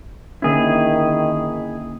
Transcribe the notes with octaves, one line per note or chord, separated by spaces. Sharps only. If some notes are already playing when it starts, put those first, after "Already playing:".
D3 D#3 A#3 C#4 E4 G#4